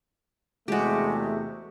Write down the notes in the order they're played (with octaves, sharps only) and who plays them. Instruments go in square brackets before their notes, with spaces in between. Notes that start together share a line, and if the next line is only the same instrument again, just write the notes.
[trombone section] E2 C3 A3 [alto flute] G#3 [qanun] F#4 G4